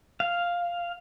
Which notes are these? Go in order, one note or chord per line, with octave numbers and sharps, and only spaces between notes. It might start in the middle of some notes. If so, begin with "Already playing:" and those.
F5